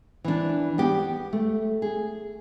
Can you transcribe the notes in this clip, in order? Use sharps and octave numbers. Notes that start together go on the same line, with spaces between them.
E3 D4
B3 G4
A3
G#4